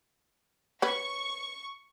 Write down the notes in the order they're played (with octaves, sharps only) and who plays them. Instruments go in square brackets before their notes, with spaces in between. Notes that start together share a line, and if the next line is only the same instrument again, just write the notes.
[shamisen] C#4 B4 [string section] C#6